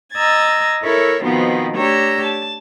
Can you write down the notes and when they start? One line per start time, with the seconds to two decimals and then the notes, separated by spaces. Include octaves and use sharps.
0.13 D#5 A#5 E6 G#6 A6
0.83 E4 A4 A#4 C#5 E5
1.23 B2 D#3 F3 B3 C4
1.77 A3 D4 G4 C#5 A#5 E6
2.25 A5